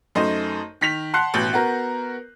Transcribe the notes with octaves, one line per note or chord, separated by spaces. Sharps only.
F#2 A3 D#4 C5 D#5
D#3 B6 F7
F#5 A5 C6 F#6 C7
A1 B2 G6 F#7
B3 F#4 A#4